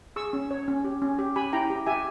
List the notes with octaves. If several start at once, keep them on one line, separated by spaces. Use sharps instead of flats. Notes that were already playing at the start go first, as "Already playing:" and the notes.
G#4 C#6 E6
C#4
C#5
C#4
G4
C#4
G4
G4 G#5 B5
E4 G5 A#5
G4
G4 E5 G#5